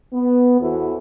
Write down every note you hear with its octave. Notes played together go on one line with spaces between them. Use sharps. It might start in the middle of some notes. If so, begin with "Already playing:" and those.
B3
E2 E3 E4 F#4 A4 C5